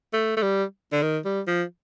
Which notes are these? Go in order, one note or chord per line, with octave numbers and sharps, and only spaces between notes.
A3
A3
G3
D3
D#3
G3
F3